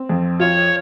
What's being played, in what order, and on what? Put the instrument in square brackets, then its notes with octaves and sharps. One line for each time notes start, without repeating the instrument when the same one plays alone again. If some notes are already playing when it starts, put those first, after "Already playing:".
Already playing: [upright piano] C4
F2
[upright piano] F4 [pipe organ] C#5